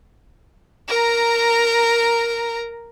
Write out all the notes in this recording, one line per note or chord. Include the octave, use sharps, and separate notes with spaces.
A#4 A#5